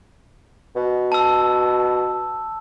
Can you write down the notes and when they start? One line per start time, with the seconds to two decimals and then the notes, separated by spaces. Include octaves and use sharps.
0.76 B2
1.12 A5 E6